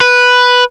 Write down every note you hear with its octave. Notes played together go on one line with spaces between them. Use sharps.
B4